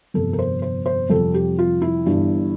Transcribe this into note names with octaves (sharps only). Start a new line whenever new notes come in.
G1 F2 C3 A4
A#4
C5
C5
C5
F2 C3 G3 C4 A4
G4
F4
E4
G1 G2 E3